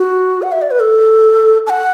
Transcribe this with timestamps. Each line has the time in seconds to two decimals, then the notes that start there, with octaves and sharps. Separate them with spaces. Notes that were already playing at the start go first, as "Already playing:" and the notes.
Already playing: F#4
0.42 F#5
0.52 E5
0.61 D5
0.71 B4
0.80 A4
1.67 A5
1.70 F#5